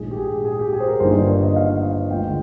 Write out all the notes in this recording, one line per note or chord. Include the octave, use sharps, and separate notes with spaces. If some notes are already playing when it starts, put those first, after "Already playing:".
Already playing: A#1 G#2 D#3 G#4
G4
G#4
G#4
G4
G#4
C5
A#4
G1 G2 D#3 A#3 D#4 C5
D5
D#5
F5
D2 D3 F3 G#3 G5